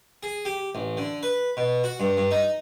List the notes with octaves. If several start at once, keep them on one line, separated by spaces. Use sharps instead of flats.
G#4
G4
A1
D3
B4
B2
F#4
G2
G2
D#4